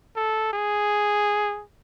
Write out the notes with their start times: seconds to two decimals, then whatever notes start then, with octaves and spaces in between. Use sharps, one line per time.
0.16 A4
0.53 G#4